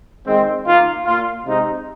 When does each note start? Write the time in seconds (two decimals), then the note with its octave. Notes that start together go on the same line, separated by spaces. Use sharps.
0.25 D#3 G#3 C4
0.65 D#3 A#3 F4
1.05 A#2 A#3 F4
1.46 C3 G#3 C4 D#4